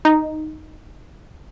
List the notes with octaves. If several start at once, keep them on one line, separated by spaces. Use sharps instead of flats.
D#4